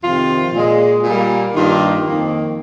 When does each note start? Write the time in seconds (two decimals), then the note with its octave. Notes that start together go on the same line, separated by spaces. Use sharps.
0.03 F2 C3 D#3 F4
0.54 A#2 G#3
1.03 A#2 G3 A#3
1.54 G2 D#3 A#3 F4
2.05 F2 D#3 A#3